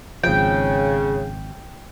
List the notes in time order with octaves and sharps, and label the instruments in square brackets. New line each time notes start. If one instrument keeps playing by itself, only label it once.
[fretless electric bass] G#1 F3 [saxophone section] C#3 [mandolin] G5